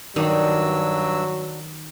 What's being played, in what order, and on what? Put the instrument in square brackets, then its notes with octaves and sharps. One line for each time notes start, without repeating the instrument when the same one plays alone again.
[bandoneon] G2 E6 [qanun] D#3 [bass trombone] F#3 [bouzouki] D4 F#4